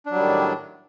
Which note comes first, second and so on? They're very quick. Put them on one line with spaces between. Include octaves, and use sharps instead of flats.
D4 F#3 G3 D#3 A2